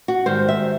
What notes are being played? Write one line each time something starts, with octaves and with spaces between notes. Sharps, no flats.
F#4
G#2 D#3 G3 C5
E5